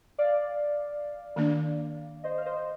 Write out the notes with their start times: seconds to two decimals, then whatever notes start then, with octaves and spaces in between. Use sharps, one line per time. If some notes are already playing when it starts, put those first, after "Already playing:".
0.18 D5 F5
1.36 D#3 A#3 D4
2.24 C5 D#5
2.38 F5
2.45 C5 D#5